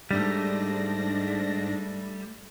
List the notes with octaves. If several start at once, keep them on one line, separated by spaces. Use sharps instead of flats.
G#2 G3 A3 D4 A#6